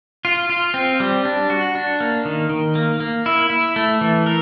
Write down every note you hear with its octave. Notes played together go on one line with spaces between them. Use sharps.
F4
F4
C4
G3
D4
F#4
D4
A#3
D#3
D#3
A#3
A#3
E4
E4
A3
E3
A#4